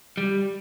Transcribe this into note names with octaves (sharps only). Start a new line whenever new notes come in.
G3